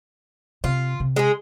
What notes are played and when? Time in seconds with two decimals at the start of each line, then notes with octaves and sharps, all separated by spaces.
0.64 C3 F4
1.00 C3
1.16 G#3 G#4